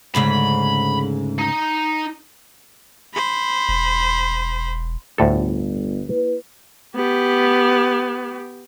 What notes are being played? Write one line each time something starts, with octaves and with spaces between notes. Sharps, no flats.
D2 G#2 C#3 B5
D#4
C5 B5
E1
G1 D2 A2 A4
A#3 E4 B4
B3 G4